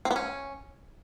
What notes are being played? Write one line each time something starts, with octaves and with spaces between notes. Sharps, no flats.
C4
B3
C#4